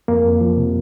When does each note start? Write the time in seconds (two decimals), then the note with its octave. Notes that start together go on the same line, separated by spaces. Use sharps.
0.08 F2 A#3
0.24 F2
0.41 F3
0.57 C3